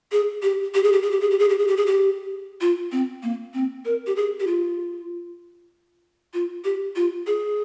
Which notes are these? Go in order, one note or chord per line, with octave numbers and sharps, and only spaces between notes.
G#4
G4
G4
G#4
G4
G#4
G4
G#4
G4
G#4
G4
G#4
G4
G#4
G4
F4
C4
A#3
C4
A#4
G4
G#4
G4
F4
F4
G4
F4
G#4